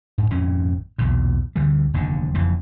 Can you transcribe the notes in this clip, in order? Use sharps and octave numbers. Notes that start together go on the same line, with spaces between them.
G#2
G#1 F2 A#2 C#4
B1 E2 A#2
D2 D3 E3 G3
F1 D#2 D3
F#1 F2 E3